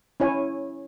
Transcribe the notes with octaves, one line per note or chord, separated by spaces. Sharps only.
C#4 E4 C#5 G#5